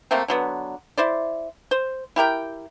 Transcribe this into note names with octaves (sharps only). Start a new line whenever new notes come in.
C3 A3 A#3 C4
D3 F#3 B3
E4 C5 D5
C5
E4 G4 A#4 G5